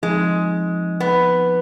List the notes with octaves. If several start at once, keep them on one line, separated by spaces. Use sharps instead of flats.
F3 G#3 C4 D#4
B3